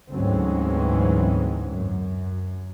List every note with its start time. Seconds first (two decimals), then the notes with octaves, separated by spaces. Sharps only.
0.12 D2 G#2 E3 F#3 C4 C#4
1.72 F#2